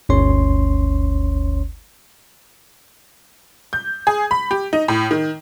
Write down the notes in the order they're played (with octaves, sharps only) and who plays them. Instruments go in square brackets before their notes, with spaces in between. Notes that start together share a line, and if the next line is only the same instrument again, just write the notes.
[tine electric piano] G1 D2 C#4 C#5 C6
[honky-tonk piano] G6
G#4
B5
G4
D#4
A2
D#3